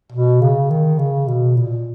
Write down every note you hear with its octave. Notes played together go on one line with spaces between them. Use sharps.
B2
C#3
D#3
C#3
B2
A#2